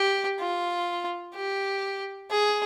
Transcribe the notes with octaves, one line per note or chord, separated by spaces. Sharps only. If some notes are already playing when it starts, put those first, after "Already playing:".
Already playing: G4
F4
G4
G#4